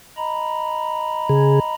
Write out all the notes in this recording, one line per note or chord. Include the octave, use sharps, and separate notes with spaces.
D#5 A#5 B5
C#3 G#4